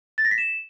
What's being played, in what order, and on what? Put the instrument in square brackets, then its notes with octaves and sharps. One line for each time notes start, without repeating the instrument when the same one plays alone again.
[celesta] A6
A#6
B6
E7